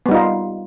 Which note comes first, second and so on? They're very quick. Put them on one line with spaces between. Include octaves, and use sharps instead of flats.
B3 G3 D#4 F4